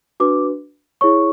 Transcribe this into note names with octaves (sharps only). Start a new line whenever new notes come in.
D4 F#4 B4 D6
E4 G#4 C#5 C#6